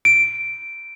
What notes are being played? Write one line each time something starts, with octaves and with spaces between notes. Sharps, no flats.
D7